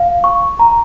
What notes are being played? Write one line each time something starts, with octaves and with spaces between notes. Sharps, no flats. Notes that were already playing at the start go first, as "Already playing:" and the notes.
Already playing: F5
C#6
A#5